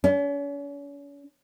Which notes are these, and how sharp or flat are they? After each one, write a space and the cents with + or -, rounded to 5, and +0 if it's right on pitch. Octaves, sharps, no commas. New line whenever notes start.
C#4 +40